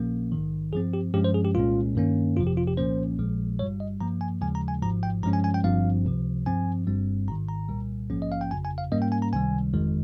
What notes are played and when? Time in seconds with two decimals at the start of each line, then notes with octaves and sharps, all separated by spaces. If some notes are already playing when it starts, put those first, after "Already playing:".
Already playing: A#1 A#2 F3 A#3 C#4
0.32 A#1 G#2 D#3
0.73 G2 F3 C4 G#4
0.93 G4
1.14 G2 F3 G#3 C#4 G4
1.24 C5
1.34 G#4
1.45 G4
1.55 C2 A#2 G#3 C#4 F4
1.96 G2 D#3 A#3 C#4
2.37 G1 F2 C3 F3 F4
2.47 G4
2.57 F4
2.67 G4
2.77 C2 A#2 F3 A#3 C#4 C5
3.19 A#1 A#2 F3 G#3
3.59 G1 G2 G3 C#5
3.80 D#5
4.01 G2 F3 A#3 A#5
4.21 G#5
4.41 D#2 C#3 F3 G#3 G#5
4.55 A#5
4.68 G#5
4.82 G#1 G#2 F3 A#5
5.03 G5
5.23 G2 F3 G#3 C#4 A#5
5.33 G#5
5.44 G#5
5.54 G5
5.64 G1 G2 F3 C4 F5
6.05 C#2 C3 F3
6.46 G2 F3 C4 G#5
6.87 G1 G2 G3 C4
7.28 G#1 G#2 D#3 A#5
7.49 A#5
7.69 C2 A#2 G3
8.10 A#1 G#2 F3 A#3 C#4
8.22 D#5
8.32 F5
8.41 G5
8.51 G1 F2 C#3 G#5
8.65 G#5
8.78 F5
8.92 G#2 G3 A#3 C#4 D#5
9.02 G5
9.12 G#5
9.22 A#5
9.33 C#2 C3 D#3 G3 G#5
9.74 G1 F2 D#3 G#3